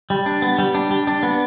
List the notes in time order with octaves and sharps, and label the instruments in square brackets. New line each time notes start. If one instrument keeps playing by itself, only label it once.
[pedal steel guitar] G3
D4
B3
G3
D4
G3
D4
B3